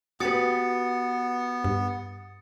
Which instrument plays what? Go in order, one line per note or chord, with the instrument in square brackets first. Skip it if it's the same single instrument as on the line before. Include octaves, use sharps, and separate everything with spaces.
[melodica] B3 [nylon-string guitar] F#4 G4 B4 [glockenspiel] D#6 A6 C#7
[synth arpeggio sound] G2